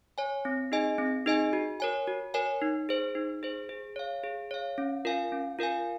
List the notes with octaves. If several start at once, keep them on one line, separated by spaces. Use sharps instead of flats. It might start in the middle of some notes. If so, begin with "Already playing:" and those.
C#5 G#5
C4
D#4 G#4 D#5 G#5
C4
D#4 G#4 D#5 G#5
F#4
A#4 C#5 G#5
F#4
A#4 C#5 G#5
D#4
G#4 C5
D#4
G#4 C5
G#4
C#5 F5
G#4
C#5 F5
C#4
F4 A#4 F5 G#5
C#4
F4 A#4 F5 G#5